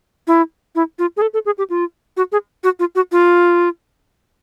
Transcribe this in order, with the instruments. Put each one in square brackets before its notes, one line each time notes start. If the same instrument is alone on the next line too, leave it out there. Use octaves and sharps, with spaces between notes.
[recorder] E4
E4
F4
G#4
A4
A4
G#4
G4
F4
F#4
G#4
F#4
F4
F#4
F4